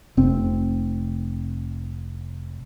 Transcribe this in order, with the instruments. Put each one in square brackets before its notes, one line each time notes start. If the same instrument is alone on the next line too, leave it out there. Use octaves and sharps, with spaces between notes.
[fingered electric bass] F1 C4